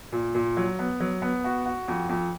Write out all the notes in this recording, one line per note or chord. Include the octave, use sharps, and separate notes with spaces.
A#2
A#2
F#3
B3
F#3
B3
F#4
F#4
F2
F2